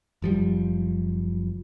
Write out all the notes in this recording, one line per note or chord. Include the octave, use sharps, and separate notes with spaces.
F#1 F3 G3